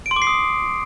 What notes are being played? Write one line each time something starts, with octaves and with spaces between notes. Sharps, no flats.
D7
C6
D6
C7
D#6